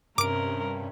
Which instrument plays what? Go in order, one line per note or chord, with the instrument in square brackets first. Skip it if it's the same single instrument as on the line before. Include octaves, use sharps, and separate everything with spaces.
[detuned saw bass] G2 [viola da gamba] C3 C#4 [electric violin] A#4 [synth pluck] D6 D7